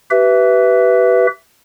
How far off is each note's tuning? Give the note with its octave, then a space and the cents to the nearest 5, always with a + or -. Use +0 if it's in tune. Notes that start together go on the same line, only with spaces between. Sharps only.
G4 -35 B4 +0 E5 +5